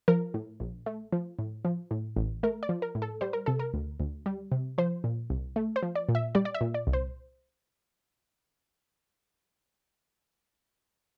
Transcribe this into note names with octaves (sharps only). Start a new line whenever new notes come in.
F3 A#4
A2
A#1
A3
F3
A2
F3
A2
A1
A3 A#4
D5
F3
A#4
A2
A4
G3 C5
A#4
C3 A4
A#4
D2
D2
G3
C3
F3 C5
A#2
C2
A3
C5
F3
D5
A#2
E5
G3 D5
D5
E5
A#2
D5
C2
C5